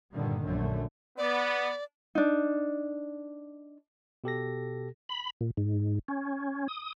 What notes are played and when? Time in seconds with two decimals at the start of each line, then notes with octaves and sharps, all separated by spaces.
0.13 G2 A#2 D3 D#3 G3
0.45 A#1 F#2 D3 A3
1.18 B3 D5
2.15 D4 D#4
4.24 B2 G4 A4 A#6
5.09 B5
5.41 A#2
5.57 G#2
6.08 C#4
6.68 D#6